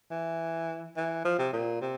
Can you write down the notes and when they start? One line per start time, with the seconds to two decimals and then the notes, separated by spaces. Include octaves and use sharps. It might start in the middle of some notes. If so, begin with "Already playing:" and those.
0.11 E3
0.96 E3
1.24 F3
1.38 C3
1.53 A#2
1.81 C3